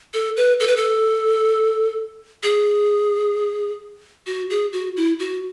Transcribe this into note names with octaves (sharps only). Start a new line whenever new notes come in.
A4
B4
A4
B4
A4
G#4
F#4
G#4
F#4
E4
F#4